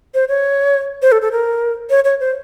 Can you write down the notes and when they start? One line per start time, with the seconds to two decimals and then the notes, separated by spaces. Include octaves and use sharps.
0.14 C5
0.29 C#5
1.02 C5
1.12 A4
1.22 A4
1.32 A#4
1.90 C#5
2.05 C#5
2.20 C5